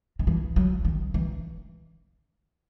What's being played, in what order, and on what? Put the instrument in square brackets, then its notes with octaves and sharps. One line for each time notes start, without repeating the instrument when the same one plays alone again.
[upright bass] D#3
E3
F#3
D#3
E3